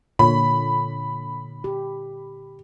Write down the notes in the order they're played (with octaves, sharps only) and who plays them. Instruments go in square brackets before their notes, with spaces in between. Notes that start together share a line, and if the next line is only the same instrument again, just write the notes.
[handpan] A#2 D3 C#5 [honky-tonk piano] B5
[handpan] G4